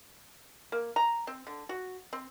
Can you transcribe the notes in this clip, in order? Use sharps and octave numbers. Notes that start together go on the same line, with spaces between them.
A#3
A#5
C4
D3
F#4
C4